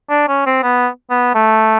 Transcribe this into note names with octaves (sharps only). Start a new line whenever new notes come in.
D4
C#4
C4
B3
B3
A3